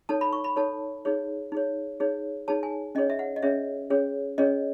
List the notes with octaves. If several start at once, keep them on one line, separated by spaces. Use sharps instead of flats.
D#4 A4 C#5 A5
B5
C#6
B5
D#4 A4 C#5 A5
D#4 G#4 C#5
D#4 G#4 C#5
D#4 G#4 C#5
D#4 G#4 C#5 A5
G#5
C#4 G#4 C#5 D#5
E5
F#5
D#5
C#4 G#4 C#5 E5
C#4 G#4 C#5
C#4 G#4 C#5 D#5